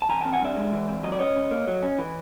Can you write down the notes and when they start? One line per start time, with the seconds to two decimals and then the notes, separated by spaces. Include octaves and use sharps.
0.02 A5
0.09 E3 G#5 A#5
0.21 C4 G5 A5
0.33 F#5 G#5
0.41 G2 D5 E5
0.57 G#3
0.73 E3
0.88 C4
1.03 F#3 D#5
1.12 D5
1.19 C#4 C#5 D#5
1.36 C#3
1.51 A#3
1.68 F#3
1.83 C#4
1.98 E3